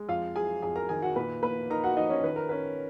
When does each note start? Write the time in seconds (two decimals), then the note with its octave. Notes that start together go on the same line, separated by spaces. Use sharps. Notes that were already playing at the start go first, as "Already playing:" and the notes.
Already playing: G#3
0.09 F2 F4 F5
0.36 F#3 G#4 G#5
0.62 F2 G#4 G#5
0.76 A#4 A#5
0.89 D#3 G#4 G#5
1.02 F#4 F#5
1.16 A#2 B4 B5
1.43 A#3 B4 B5
1.70 D#4 A#4 A#5
1.84 F#4 F#5
1.97 F3 D#4 D#5
2.10 C#4 C#5
2.24 D#3 B4
2.36 A#4
2.49 C#4 B4